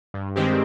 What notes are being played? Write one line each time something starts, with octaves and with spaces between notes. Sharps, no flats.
G2
D#3 G#3 C4 G4